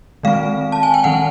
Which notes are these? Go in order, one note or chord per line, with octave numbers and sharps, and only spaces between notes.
D#3 G#3 C4 F5
A5
G#5
G5
D#3 G#3 C4 F#5